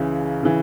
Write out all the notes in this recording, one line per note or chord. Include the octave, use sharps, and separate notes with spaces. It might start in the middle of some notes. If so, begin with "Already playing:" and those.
Already playing: C#2 C#3 E3
C#3 E3